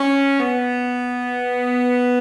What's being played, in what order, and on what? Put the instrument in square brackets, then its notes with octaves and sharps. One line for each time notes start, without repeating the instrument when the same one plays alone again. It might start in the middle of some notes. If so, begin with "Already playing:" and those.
Already playing: [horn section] C#4
B3